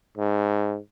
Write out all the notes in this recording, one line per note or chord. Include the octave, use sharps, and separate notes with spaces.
G#2